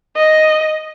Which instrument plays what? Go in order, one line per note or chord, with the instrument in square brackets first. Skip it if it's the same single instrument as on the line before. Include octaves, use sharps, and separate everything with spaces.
[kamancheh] D#5